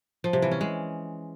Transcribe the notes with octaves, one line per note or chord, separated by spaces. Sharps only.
F3
C3
E3
C#4
G#3